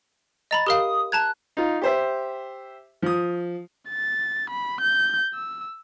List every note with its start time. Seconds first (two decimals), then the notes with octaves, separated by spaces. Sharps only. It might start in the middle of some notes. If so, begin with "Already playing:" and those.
0.51 D#5 A#5 B5 A6
0.67 G4 A#4 F5 D#6
1.12 A5 A#5 F#6 G#6
1.57 D#4 F4
1.81 G4 C5 E5
3.02 F3 D#6
3.90 A6
4.50 B5
4.82 G6
5.34 E6